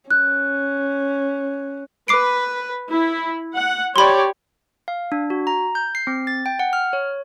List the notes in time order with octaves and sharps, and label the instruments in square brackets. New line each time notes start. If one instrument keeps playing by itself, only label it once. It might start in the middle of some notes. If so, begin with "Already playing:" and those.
[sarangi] C#4 [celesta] F#6
[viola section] B4 [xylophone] D6 C7 D7
[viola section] E4
F#5
[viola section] G4 C#5 D5 [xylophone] B5 C6
[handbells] F5
D4
F#4
A#5
G6
C7
C4
A6
G5
F#5
F6
C#5